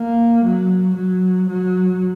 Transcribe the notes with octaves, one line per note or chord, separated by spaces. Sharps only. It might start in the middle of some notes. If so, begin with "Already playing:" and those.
Already playing: A#3
F#3
F#3
F#3